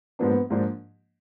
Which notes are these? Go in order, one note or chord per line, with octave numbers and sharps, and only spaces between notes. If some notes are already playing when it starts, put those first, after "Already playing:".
G#2 F3 A#3 B3 D4
G#2 F3 A#3 D4